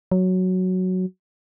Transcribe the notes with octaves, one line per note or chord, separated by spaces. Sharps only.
F#3